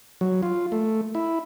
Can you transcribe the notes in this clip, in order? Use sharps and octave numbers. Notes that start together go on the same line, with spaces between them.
F#3
F4
A3
E4